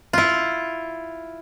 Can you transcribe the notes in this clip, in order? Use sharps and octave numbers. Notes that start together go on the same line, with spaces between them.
E4 F4